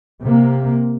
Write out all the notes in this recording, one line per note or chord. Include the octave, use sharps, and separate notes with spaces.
C3 A#3